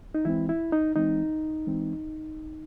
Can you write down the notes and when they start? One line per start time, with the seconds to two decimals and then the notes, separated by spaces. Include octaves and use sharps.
0.15 D#4
0.25 E3 G#3 C4 E4
0.49 E4
0.72 D#4
0.95 E3 G#3 C4 D#4
1.67 E3 G#3 C4